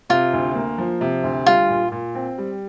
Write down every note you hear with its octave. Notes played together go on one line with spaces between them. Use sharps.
C3 F4
D2
A#3
F3
C3
D2
G3 F4
A#2
A#2
C4
G3